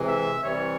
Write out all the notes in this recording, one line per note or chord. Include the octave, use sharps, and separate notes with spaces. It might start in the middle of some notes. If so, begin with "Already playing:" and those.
Already playing: C3 E3 G#3
E5
C3 E3 G3 C#5